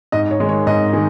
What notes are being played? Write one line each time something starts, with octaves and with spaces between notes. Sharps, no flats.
G#2 D#5
C#5
D#3 G#3
C#5
G#2 D#5
D#3 G#3